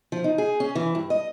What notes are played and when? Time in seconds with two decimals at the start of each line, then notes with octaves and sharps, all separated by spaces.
0.12 F3
0.24 D#4
0.38 G#4
0.60 C#4
0.75 E3
0.95 G2
1.10 D#5